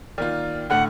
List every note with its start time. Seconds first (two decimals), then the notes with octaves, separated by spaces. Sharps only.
0.18 D#3 A#3 F4 D5 F6
0.70 A2 D3 A3 F#5 F6